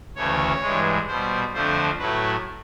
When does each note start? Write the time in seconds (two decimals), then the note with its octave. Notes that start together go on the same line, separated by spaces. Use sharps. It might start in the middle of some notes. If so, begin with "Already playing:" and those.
0.16 D2 C#3 E3 A3 C#5
0.62 G2 E3 G#3
1.07 B2 G3 C5
1.53 F2 D3 F3 A3 C5
1.99 A2 F#3 A3 B4